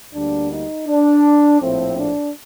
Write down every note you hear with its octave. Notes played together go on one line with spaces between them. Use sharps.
D2 D3 G3 A#3 D4
D#4
D4
A#1 A2 F3 A3 C4
D4